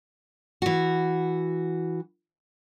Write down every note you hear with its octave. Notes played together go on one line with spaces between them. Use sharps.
E3 F#4